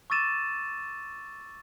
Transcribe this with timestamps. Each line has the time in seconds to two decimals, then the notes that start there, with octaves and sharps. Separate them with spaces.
0.10 C#6 D6 E6 A6 D#7 E7